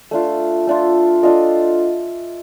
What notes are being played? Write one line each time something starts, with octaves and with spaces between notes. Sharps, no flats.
A3 D4 F4
A3 D4 F4
A3 D4 F4 D#5